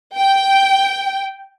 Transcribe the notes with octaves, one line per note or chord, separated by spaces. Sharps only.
G5